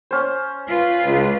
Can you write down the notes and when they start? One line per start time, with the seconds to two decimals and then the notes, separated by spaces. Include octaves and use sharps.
0.11 C#4 C5
0.69 F4 B4
1.06 C#2